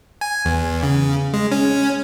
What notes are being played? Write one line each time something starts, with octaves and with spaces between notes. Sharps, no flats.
G#5
E2
C#3
G#3
C#4